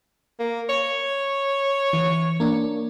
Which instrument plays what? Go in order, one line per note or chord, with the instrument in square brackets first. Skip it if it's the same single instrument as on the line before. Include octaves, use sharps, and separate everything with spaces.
[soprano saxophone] A#3
C#5
[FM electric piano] E3
A#3 D4